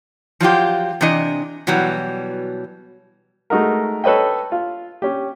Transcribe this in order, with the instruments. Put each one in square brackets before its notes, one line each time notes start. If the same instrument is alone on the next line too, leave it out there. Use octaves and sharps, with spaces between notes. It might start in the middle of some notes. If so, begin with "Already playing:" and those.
[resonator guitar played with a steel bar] F3 F#3 F4 G4
C3 E3 D4 D#5
B2 E3 F#3 G3
[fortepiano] G#3 A3 D#4 F#4 A#4
A4 B4 C#5 D#5 G5
F4
C#4 G4